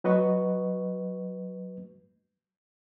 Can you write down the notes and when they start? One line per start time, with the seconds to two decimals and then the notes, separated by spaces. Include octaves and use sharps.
0.04 F#3 F#4 B4 D#5 C#6